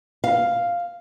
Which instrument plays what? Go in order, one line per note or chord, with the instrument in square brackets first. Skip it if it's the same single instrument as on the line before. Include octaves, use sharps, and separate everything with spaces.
[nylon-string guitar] F5